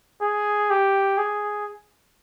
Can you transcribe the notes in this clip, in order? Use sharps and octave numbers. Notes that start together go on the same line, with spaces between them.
G#4
G4
G#4